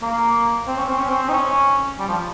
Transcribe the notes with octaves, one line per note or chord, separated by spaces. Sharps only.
A#3
C4
C#4
C4
C#4
C4
D#4
C#4
G3
F3